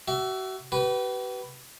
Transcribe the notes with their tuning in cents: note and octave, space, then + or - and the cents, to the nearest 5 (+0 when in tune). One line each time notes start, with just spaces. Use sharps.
F#4 +35 E5 +5
G4 -45 B4 +0